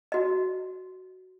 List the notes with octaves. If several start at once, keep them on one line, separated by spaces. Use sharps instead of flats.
F#4 D#5